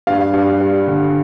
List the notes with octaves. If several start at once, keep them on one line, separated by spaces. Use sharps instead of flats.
G2 F5
G2
G3
D3